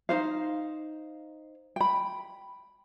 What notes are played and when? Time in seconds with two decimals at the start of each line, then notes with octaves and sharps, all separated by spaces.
0.09 D#4 F#4 C5 F5
1.76 G5 B5